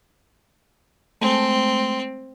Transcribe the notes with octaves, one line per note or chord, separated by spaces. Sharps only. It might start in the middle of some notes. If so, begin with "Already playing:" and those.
G#3 A3 C4